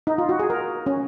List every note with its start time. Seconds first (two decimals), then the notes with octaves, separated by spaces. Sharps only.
0.07 D#4
0.18 F4
0.29 F#4
0.39 G#4
0.50 A#4
0.86 C#4